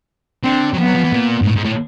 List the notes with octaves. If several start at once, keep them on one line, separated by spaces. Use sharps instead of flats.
D3 C4
F#3
F3 B3
F#3
F3
E3
A#2
G#2
A2
G#2
A2